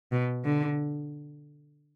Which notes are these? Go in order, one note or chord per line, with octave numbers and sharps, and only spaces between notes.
B2
D3